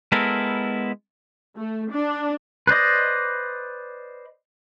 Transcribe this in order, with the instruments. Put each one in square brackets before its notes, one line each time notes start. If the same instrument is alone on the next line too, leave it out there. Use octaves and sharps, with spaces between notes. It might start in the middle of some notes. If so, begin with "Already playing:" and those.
[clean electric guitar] G#3 B3 E4 A4 A#4
[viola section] A3
D4
[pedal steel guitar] B4 C5 D5 D#5